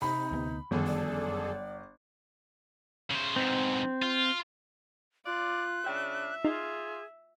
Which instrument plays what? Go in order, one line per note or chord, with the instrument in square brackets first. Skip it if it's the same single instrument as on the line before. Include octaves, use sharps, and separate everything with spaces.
[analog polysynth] C3 [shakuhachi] D#4 [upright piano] B5
[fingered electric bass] D2 G3 B3
[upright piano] G1 [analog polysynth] F#2 G#4 A4 [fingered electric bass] D#3 F3
[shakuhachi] D5
[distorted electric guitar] C#3 C5
[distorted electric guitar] G#2 B2 [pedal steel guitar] C4
[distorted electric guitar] F4
[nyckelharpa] F4 [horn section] D5 [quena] F#6
[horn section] C#3 D4 [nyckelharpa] E5 [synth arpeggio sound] G5
[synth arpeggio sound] D#4 [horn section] F4 [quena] G#4